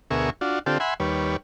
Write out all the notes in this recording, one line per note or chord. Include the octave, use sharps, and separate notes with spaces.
D2 B2 G#4 A#4 E5 C#6
D4 F4 F#4
D3 C4 F4 G4 A4
E5 F#5 G#5 B5 C6
D#2 G3 B4 C#5